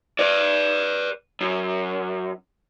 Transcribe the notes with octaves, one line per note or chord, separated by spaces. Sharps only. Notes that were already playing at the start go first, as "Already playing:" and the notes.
B4 D5
F#2